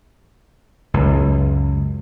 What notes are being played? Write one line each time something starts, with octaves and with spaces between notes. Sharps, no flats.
C#2 F#2